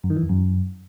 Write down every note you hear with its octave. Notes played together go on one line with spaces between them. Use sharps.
F#2
D#3
E3
F2
F#2